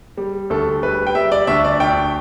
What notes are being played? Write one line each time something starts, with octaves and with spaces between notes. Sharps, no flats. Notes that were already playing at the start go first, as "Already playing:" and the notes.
G3
D2 A4
G3 B4
G5
G3 E5
D5
D2 E5
D5
D2 G5